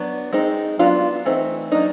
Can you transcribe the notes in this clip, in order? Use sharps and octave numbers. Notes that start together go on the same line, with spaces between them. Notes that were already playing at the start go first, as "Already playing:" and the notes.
Already playing: F#3 B3 D4
G#3 C4 D#4
F#3 B3 D4 F4
E3 A3 C4 D#4
F#3 A#3 D4 D#4